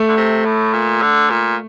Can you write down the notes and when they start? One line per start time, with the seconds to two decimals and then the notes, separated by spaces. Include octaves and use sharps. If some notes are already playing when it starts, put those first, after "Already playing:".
Already playing: A3
0.09 D3
0.17 C3
0.45 A2
0.73 A#2
1.02 D3
1.30 A#2